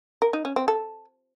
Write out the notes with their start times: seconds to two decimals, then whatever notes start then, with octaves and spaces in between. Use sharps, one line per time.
0.22 A#4
0.33 D#4
0.45 C#4
0.56 C4
0.68 A4